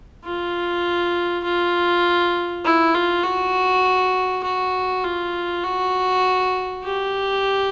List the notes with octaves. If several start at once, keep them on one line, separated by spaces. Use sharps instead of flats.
F4
F4
E4
F4
F#4
F#4
F4
F#4
G4